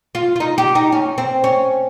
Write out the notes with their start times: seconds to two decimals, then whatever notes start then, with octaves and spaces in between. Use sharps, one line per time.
0.15 F4
0.36 F4
0.40 D#4
0.58 G4
0.75 D#4
0.92 C#4
1.18 C4
1.44 C#4